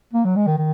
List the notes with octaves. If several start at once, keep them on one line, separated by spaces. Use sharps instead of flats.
A#3
F#3
G#3
D#3
D#3